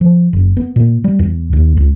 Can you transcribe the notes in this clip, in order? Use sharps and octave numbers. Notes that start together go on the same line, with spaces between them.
F3
F#1
B3
A#2
G3
E2
D#2
C#2